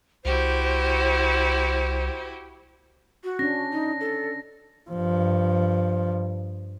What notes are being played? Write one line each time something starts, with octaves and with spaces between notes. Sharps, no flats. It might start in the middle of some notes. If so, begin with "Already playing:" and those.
C2 E4 F#4 G4 C5
F#4
C#4 D4 A#6
D#4
A4
G2 F3